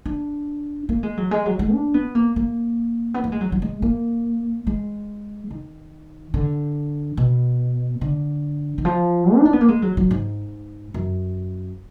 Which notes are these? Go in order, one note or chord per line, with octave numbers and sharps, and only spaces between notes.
D4
A#3
G#3
F#3
G#3
F#3
G#3
D4
B3
A#3
A#3
B3
A#3
G#3
F#3
F#3
G#3
A#3
G#3
D#3
D3
B2
D3
D#3
F3
D#4
D4
B3
A#3
G#3
F#3
F#3
G#2
F#2